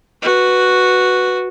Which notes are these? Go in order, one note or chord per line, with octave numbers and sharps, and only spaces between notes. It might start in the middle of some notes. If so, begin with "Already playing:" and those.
F#4 B4